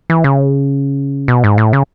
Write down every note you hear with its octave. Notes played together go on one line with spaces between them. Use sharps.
E3
C#3
B2
G#2
A2
C#3